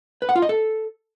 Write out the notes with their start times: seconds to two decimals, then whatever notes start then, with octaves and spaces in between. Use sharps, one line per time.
0.22 B4
0.29 F#5
0.36 F4
0.42 D#5
0.49 A4